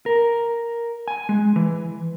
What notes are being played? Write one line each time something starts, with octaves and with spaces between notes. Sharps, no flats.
A#4
G#5
G#3
E3